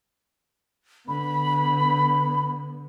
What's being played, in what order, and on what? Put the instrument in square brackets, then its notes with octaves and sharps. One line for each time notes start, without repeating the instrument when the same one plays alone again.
[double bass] D3 B3 [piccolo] B5